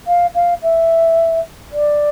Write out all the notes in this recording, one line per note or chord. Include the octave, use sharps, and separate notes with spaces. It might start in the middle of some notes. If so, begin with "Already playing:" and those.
F5
F5
E5
D5